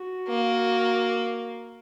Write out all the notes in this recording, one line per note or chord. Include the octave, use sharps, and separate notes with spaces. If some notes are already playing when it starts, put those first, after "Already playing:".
Already playing: F#4
A#3